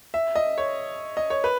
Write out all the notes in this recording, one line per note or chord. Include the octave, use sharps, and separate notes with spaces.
E5
D#5
C#5
D#5
C#5
B4